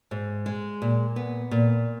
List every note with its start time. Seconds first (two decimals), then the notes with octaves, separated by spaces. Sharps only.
0.11 G#2
0.46 G#3
0.82 A#2
1.16 B3
1.51 A#2